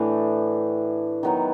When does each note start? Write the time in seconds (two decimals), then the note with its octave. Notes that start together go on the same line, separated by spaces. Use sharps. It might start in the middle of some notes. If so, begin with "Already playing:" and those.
Already playing: A2 E3 A3 D4
1.23 D#3 F#3 B3 D#4